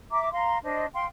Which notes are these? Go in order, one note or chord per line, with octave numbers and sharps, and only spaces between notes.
E5 A#5 D6
F5 A#5 C6
D4 C5 D#5
F5 G5 C6